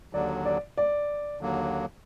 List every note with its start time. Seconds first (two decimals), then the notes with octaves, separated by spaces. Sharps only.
0.13 D#2 D3 F#3 D5
0.45 D5
0.78 D5
1.41 D#2 D3 F#3 A#3